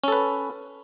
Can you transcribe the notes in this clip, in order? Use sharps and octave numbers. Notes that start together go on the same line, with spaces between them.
C#4 A4 B4